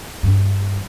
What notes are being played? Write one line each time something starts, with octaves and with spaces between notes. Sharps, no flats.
G2